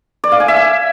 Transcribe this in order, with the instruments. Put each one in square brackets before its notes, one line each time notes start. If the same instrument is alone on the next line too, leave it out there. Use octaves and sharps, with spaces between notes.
[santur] D5
F5
G#5
E5
G#5